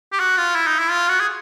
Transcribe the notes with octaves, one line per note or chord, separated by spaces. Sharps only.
G4
F#4
F4
E4
D#4
E4
F4
F#4
G#4